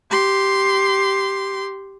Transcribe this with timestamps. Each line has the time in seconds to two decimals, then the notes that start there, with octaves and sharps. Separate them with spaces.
0.11 G4 C6